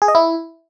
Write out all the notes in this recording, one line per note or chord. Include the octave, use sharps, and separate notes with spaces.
G#4
D#5
E4